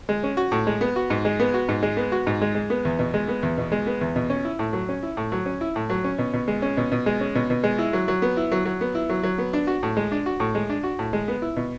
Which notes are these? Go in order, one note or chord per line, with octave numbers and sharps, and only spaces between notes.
G#3
C#4
F#4
A2
G#3
B3
F#4
G#2
G#3
B3
F#4
G#2
G#3
B3
F#4
G#2
G#3
G#3
B3
E2
B2
G#3
B3
E2
B2
G#3
B3
E2
B2
C#4
E4
A2
F#3
C#4
E4
A2
F#3
C#4
E4
A2
F#3
C#4
B2
B2
G#3
C#4
B2
B2
G#3
C#4
B2
B2
G#3
E4
F#3
F#3
B3
E4
F#3
F#3
B3
E4
F#3
F#3
B3
D4
F#4
A2
G#3
D4
F#4
A2
G#3
D4
F#4
A2
G#3
B3
E4
B2